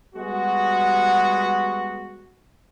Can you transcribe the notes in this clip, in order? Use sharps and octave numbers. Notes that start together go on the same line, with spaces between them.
G3 G#3 B3 F#4